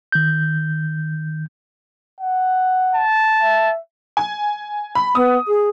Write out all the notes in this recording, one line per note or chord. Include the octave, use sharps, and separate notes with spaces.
D#3 G6
F#5
A5
E5
G#5
B5
B3 D#6
G#4